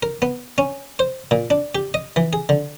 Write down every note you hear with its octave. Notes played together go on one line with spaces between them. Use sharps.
A#4
B3
C#4
C5
A#2
D4
G4
D#5
E3
G#4
D3